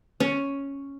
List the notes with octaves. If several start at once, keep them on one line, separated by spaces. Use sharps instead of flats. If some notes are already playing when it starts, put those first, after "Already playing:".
C#4